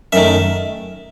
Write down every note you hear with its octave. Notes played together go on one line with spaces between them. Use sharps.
F#2 D#3 A3 E5